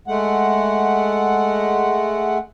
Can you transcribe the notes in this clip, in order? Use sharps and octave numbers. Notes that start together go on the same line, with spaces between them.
G#3 A3 F#5